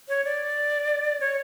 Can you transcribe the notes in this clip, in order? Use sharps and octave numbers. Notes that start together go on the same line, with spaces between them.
C#5
D5
C#5